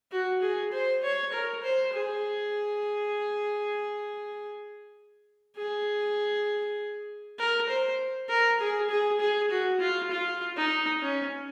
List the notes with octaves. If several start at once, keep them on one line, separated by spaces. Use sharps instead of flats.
F#4
G#4
C5
C#5
A#4
C5
G#4
G#4
A#4
C5
A#4
G#4
G#4
G#4
F#4
F4
F4
D#4
C#4